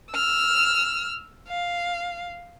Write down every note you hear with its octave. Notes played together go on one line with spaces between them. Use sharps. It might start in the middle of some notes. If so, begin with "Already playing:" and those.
E6 F6
F5